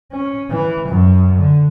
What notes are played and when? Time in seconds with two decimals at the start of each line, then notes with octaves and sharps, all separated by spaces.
0.12 C#4
0.50 E3
0.89 F#2
1.38 D3